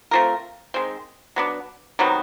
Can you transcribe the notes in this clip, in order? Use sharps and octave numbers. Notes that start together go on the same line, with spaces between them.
A3 C4 F4 A#4
D#3 G#3 C4
F#3 B3 D4
C3 D#3 F#3 B3